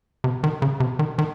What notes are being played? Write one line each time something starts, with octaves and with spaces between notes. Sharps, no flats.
C3
D#3
C#3
C3
D#3
D#3